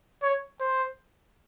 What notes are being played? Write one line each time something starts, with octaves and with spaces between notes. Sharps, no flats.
C#5
C5